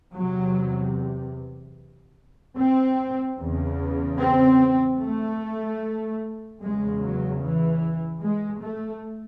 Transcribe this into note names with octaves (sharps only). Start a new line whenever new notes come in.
E2 C3 F#3
C4
E2 C#3
C4
A3
E2 C#3 G#3
F#3
E3
G#3
A3